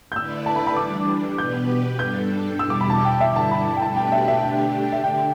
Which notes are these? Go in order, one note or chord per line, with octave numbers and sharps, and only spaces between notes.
G6
D3 A3 E4 B4 D5 E6
A5
B5
B5
E3 G3 D4 D6
B2 B3 G4 B4 G6
G2 G3 D4 A4 G6
E2 B2 G3 E4 G4 E6
D6
B5
A5
G5
G2 D3 G3 E4 E5
A5
B5
G5
B2 A3 D4 G4 B4 A5
G5
E5
E5
D3 A3 D4 G4 G5
E5
D3 G5